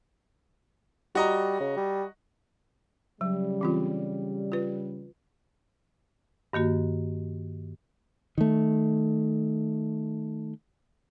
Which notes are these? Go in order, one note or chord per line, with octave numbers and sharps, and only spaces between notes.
G3 F#4 D#5 A#5
C#3
G3
C#3 F#3 G3
E3 C4 F4
F4 B4
G2 D#3 A#3 F#4
D#3 A3